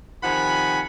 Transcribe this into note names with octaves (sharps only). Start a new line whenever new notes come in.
C3 D#3 F3 F#5 G#5 B5